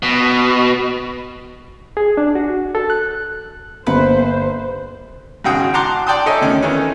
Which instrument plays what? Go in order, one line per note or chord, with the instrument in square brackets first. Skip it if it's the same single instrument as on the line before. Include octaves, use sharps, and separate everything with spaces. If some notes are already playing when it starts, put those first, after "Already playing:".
[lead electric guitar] B2
[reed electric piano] G#4
D4
F#4
A4
F#6
[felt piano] G1 A#3 C#7 [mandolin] B4 [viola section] C5
[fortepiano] G#1 C#3 F#4 G#4 G5 D#6
F#5 A5 A#5 C6 D6 F#6
D5 G5 A5 C6 D#6
A4 C#5 D#5 E5 G#5
D2 D#3 C#4
D#3 E3 A3 C#4